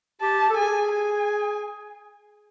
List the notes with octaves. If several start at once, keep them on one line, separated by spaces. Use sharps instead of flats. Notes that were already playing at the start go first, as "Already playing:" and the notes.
G4 A5
A4
G#4 G#5
G#5